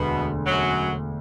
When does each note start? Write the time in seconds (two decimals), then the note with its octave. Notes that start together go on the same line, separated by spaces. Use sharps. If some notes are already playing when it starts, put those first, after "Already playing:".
Already playing: E1 D2 B2 D3 B3
0.46 F#2 F#3